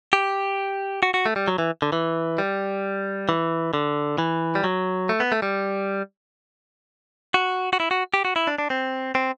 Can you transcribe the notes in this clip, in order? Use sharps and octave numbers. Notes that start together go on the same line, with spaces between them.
G4
F#4
F#4
A3
G3
F#3
E3
D3
E3
G3
E3
D3
E3
G3
F#3
A3
B3
A3
G3
F#4
F#4
E4
F#4
G4
F#4
E4
D4
D4
C4
C4